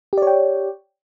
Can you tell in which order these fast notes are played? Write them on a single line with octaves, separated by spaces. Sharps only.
G4 D5 C#5 G5